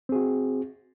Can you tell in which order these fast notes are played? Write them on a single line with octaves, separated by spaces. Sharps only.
C4 G#4 F#4